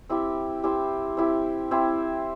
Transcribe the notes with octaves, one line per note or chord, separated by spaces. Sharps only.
C4 E4 G4
C4 E4 G4
C4 E4 G4
C4 E4 G4